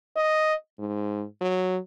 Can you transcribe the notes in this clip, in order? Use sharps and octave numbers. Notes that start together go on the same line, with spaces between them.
D#5
G#2
F#3